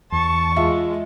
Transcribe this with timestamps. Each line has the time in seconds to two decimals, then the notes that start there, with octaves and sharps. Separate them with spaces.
0.12 E2 A5 C#6
0.56 G#3 F4 E5